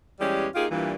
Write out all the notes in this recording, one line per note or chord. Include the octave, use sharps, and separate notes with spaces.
E2 E3 G3 G#3 C#4 G4
A#3 D#4 F4 G4 G#4
G2 A#2 E3